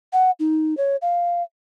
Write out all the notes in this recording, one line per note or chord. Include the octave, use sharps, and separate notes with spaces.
F#5
D#4
C#5
F5